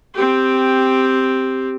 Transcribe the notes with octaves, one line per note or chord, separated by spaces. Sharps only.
C4 G4